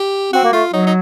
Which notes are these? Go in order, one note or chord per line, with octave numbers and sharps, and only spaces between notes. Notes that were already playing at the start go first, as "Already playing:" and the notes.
Already playing: G4
C4 F#4
A#3
A3 F4
F#3 D#4
D#4